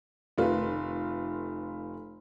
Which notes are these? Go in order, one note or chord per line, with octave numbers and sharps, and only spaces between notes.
F1 D#3 A3 F4 B4